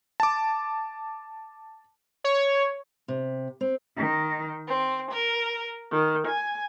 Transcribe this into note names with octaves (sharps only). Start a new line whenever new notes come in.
A5 D6
C#5
C3
C4
D#3
C4
A#4
D#3
G#5